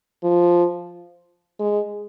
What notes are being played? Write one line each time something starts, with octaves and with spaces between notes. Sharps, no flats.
F3
G#3